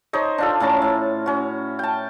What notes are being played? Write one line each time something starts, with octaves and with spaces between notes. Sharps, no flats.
D#4 C5 C#5 D#5
D4 F4 A4
A2 C#4 A5 A#5
A2
C#4 F#4
G5 A5